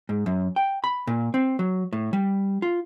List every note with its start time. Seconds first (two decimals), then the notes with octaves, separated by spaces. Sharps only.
0.09 G#2
0.26 F#2
0.56 G5
0.84 B5
1.07 A#2
1.34 C4
1.59 F#3
1.93 A2
2.13 G3
2.62 F4